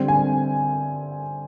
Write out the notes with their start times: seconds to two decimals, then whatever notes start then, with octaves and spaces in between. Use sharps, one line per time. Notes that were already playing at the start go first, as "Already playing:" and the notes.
Already playing: D3 G3 C4
0.08 G#5